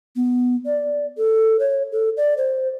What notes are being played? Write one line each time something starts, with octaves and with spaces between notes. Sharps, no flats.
B3
D5
A4
C#5
A4
D5
C5